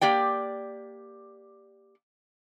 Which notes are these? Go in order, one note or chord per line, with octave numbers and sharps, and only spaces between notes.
A#3 G4 D5 G5